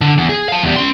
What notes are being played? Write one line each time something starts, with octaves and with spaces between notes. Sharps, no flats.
D3
E2
G#4
F5 A5
E2 G3
C#4 C6